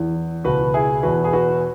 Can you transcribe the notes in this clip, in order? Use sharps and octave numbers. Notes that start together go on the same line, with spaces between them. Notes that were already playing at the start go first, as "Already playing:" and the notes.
Already playing: E2 E3
C#2 B2 F#4 B4
E4 G#4
E2 B2 F#4 B4
G#4
F#4 B4